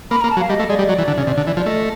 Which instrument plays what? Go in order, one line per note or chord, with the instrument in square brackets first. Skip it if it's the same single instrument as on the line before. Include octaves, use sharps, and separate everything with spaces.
[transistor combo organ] A#3 [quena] B5
[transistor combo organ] A#3 [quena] A#5
[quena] A5
[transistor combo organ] F#3
[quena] F5
[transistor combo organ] G3 [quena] D#5
[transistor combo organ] A3
[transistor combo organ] G#3 [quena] D5
[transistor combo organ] G3
F#3
E3
D3
C#3
C3
D3
E3
[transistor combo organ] F3 [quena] D5
[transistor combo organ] A3 [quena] D#5